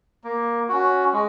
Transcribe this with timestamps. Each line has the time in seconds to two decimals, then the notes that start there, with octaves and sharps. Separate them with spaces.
0.24 A#3
0.69 C#4 F#4
1.13 G#3